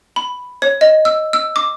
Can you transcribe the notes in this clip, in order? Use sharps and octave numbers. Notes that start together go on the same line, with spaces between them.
B5
C#5
D#5
E6
E6
D6